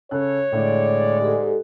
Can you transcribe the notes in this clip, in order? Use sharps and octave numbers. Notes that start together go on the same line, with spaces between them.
C#3 A4 C#5 F#6
A2 D3 G#3 D5
G#2 G4 A4